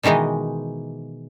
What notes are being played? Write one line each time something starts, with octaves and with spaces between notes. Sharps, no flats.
B2 D#3 E3 G#3 D#4